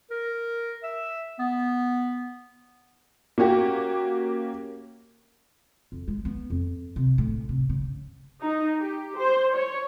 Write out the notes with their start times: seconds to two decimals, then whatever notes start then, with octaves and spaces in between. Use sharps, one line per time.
0.10 A#4
0.83 E5
1.39 B3
3.38 A#3 C#4 F#4 G4
5.92 F2
6.08 G#3
6.25 B3
6.50 F2
6.96 C3
7.18 A2
7.49 C3
7.69 C#3
8.42 D#4
8.79 G4
9.18 C5
9.55 C#5